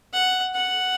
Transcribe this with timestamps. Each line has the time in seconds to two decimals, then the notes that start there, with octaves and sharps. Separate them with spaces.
0.14 F#5
0.55 F#5